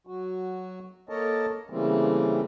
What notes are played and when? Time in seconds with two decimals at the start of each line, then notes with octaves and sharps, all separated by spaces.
0.07 F#3 F#4
1.09 A#3 A4 A#4 C#5 D#5 A5
1.70 C#3 E3 G3 A3 A#3 C4